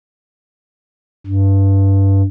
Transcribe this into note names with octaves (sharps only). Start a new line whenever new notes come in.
G2